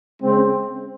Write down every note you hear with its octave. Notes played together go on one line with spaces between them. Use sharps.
C#3 G#3 C4